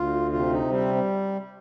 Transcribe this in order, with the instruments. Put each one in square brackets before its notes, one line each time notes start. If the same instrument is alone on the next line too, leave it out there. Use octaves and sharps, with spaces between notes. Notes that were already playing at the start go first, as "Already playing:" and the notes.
Already playing: [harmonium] D2 F4
C3 F4
D#4
G3 C4